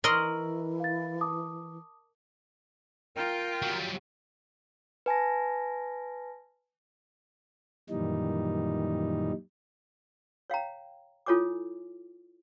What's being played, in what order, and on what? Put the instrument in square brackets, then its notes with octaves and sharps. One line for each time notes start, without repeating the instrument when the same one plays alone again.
[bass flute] E3 [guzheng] A#4 D#5 C6 [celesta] C#6 E6 F#7
[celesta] F5 A6
A5 D6 D#6
[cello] F4 [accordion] A#4 G5
[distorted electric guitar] F#3 G3
[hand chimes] B4 G#5 A5 A#6
[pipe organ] F#2 A#2 D#3 E3 G3 D#4
[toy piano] C#5 F5 G5 A#5
E4 F4 A4 C#5 G#5 D6